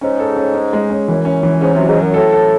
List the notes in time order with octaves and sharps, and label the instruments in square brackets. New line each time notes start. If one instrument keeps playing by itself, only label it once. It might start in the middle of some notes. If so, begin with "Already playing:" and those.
[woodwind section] G#2 [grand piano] C#4
[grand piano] A4
C#4
C#4
G#3
C#4
[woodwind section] F#2 [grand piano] E3
[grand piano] C#4
E3
[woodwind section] G#2 [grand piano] C#4
[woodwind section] C3 [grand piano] F#3
[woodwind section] G#2
[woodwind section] F#2 [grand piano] F#3
[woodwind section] A2 [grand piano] A4
[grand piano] A4